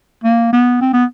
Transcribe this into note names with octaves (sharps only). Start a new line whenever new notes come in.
A#3
B3
C4
B3